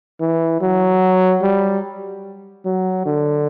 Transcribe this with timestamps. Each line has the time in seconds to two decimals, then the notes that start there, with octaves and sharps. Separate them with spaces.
0.20 E3
0.61 F#3
1.43 G3
2.65 F#3
3.06 D3